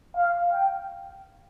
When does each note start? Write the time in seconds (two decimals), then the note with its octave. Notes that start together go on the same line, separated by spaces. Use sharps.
0.15 F5
0.53 G5